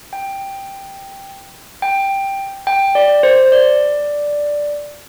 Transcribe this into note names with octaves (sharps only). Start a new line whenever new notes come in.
G5
G5
G5
D5
C5
D5